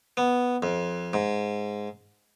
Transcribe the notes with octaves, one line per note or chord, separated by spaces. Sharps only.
B3
F2
G#2